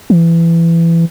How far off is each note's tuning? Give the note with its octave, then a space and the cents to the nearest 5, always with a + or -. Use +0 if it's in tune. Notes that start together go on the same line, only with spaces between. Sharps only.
E3 +20